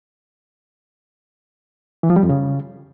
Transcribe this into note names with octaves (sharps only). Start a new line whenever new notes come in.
E3
F3
G3
F2
C#3